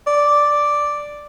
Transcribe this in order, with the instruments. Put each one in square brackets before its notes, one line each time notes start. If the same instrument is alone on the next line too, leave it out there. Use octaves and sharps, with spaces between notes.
[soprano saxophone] D5